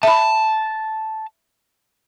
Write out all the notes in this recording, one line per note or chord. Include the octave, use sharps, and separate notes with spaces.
E5 A5 B5